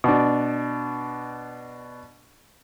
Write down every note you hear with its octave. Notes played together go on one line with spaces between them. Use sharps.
B2 D4